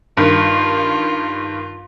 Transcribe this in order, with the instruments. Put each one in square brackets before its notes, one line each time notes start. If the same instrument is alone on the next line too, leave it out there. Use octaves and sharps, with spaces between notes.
[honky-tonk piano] G2 D#3 [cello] F4